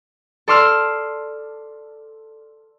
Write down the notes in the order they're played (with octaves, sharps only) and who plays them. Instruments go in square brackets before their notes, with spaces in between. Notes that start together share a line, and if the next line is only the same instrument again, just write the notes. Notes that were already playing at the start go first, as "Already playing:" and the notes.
[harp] A4 D5 C6 E6 F6